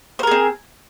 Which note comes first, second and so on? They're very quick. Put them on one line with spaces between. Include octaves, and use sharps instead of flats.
C5 A#4 G#4 C4